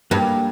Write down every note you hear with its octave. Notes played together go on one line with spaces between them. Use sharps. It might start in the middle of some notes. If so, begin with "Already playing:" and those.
G2 G3 A#3